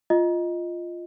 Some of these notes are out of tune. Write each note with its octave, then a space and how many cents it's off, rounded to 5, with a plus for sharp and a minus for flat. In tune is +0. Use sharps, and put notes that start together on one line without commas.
F4 -5 D#5 +0